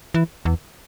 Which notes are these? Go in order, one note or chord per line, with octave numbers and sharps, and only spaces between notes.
E3
E2